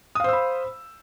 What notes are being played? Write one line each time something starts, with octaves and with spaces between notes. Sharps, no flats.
C5 F5 B5 D#6 E6